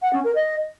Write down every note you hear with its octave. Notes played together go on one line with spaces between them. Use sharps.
F#5
C#4
A#4
D#5